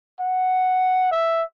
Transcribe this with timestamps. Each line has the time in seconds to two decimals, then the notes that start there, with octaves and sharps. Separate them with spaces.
0.20 F#5
1.12 E5